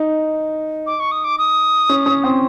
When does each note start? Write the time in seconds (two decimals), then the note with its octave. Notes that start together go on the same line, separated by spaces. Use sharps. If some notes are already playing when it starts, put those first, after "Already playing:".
Already playing: D#4
0.87 D6
1.00 C#6
1.11 D#6
1.24 D6
1.38 D#6
1.89 C#4
2.06 C#4
2.24 C4